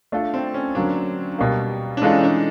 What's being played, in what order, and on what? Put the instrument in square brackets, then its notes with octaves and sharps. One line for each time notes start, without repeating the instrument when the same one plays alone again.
[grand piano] A3 D4 F4 A4
[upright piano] C4
C#4
[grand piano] D3 F#3 A#3 [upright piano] D4
[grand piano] B2 G3 A#3
[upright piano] D4
[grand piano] E3 G#3 C#4 F4 A4 [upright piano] D#4
[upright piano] D#4
D4